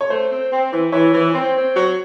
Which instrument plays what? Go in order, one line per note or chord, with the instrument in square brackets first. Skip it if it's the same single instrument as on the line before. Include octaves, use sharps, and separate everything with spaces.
[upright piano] C#5
[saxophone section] A3 [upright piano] C5
[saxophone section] C4
C4
E3
[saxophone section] E3 [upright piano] C#5
[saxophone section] E3
C4
C4
F#3